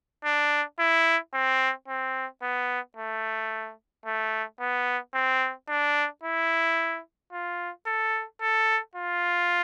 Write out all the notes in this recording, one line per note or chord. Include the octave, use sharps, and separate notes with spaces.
D4
E4
C4
C4
B3
A3
A3
B3
C4
D4
E4
F4
A4
A4
F4